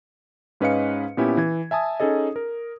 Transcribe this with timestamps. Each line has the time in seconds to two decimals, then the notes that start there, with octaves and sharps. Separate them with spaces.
0.61 G#2 C#4 B4 D#5 F5 C#7
1.17 A#2 B3 C#4 E4 G4
1.37 E3 G#6
1.71 E5 G#5 A5 D#6
2.00 C#4 D#4 G#4 A4 D#5
2.36 A#4